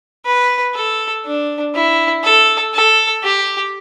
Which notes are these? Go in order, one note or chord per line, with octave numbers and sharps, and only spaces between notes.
B4
A4
D4
E4
A4
A4
G4